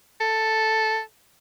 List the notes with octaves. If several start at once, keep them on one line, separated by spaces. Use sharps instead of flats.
A4